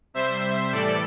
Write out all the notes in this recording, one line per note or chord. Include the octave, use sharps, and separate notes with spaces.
C3 G3 C5 E5
A2 E3 G3 A4 D5